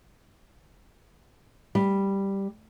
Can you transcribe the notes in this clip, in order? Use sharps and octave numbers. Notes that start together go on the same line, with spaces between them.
G3